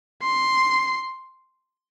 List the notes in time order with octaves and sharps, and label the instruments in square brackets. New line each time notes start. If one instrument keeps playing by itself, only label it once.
[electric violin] C6